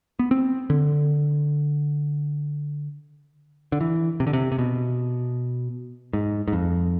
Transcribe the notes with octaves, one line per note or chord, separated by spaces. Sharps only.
B3
C4
D3
D3
E3
C3
D3
C3
C3
B2
G#2
G#2
F2